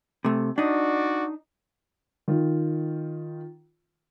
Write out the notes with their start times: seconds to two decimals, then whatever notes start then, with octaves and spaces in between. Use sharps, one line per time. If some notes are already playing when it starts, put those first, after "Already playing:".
0.25 C3 A3
0.58 D4 D#4 F#4 D5
2.28 D#3 F4